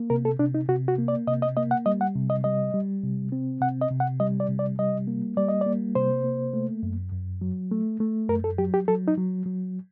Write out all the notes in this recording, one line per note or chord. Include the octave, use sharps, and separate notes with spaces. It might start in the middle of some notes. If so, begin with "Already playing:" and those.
Already playing: A#3
C3 A#4
A4
C3 D4
D#4
C3 F#4
F#4
A#3
D5
C3 D#5
D#5
A#3 D#5
F#5
G3 D#5
F#5
C3
D#5
G3 D#5
G3
C3
C4
C3 F#5
D#5
C3
F#5
G3 D#5
D5
C3
D5
G3 D#5
A#3
G3 D5
D#5
A#3 D5
C3 C5
A#3
A3
F#2
F#2
F#3
A3
A3
F#2 A#4
A4
F#3 G4
G4
F#3 A4
D#4
F#3
F#3